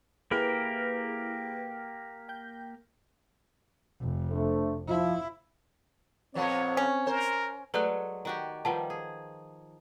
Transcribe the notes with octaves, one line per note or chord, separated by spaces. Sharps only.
A#3 E4 G4 G#4 A#4 B4
G5 G6
F1
A3 D4 C5
F3 E4
F2 A#2 B3 C4 C#5
C#4
A#4 C5
F#3 G#3 A3 B4 D5 F#6
D#3 F#4 G4
D#3 F3 G3 B4 F#5 A5
G#4